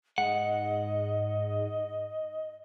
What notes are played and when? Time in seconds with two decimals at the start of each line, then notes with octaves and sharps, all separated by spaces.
0.18 G#2 D#5 F#5